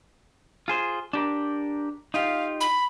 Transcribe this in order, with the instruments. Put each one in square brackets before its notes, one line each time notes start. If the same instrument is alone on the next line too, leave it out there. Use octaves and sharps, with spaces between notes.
[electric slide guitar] F4 G#4 C5
D4 G4 A#4
[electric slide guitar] D#4 F4 G4 [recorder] F5
[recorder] B5